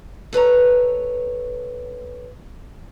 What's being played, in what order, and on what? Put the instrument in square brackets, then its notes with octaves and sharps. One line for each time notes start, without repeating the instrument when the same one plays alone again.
[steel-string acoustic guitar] A4 B4 C#5 A#5